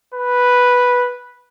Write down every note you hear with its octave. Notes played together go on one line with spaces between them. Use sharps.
B4